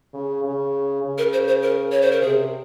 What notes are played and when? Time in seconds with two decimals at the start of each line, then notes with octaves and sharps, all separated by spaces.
0.14 C#3
0.44 C#3
1.03 C#3
1.18 A#4
1.33 C5
1.48 C5
1.63 A#4
1.92 C#5
2.02 C5
2.12 A#4
2.22 C3 G#4